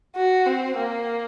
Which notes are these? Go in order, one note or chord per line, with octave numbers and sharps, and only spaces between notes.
F#4
C4
A#3